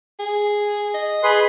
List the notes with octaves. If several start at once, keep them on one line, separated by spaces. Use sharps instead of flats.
G#4
D#5
G#4 B4 C6